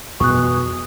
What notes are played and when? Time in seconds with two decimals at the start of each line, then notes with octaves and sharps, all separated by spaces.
0.20 F2 B2 E3 G3 G#4 C#6 F#6